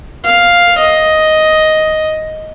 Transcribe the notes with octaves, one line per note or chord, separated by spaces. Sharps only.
F5
D#5